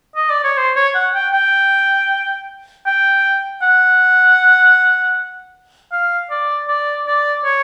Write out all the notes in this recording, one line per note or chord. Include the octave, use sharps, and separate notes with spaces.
D#5
D5
C#5
C5
C#5
F#5
G5
G5
G5
F#5
F5
D5
D5
D5
C#5